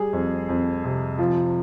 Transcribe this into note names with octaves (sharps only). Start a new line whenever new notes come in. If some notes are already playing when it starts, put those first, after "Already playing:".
Already playing: G3 G#4
F2
F2
C3
F3